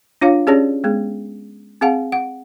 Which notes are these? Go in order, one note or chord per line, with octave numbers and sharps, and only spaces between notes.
D4 F4 C#5 F5
C#4 G4 G#4 C#5 D5 A5
G#3 B3 G#4
C4 G#4 F5 F#5 A5
F#5